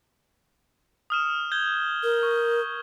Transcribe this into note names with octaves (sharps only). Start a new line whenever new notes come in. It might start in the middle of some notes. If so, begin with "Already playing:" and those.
D#6 F6 E7
G6 G#6 G7
A#4
C#6